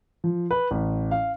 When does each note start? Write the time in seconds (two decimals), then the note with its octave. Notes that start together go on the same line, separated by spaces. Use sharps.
0.24 F3
0.51 B4
0.71 A1
1.11 F5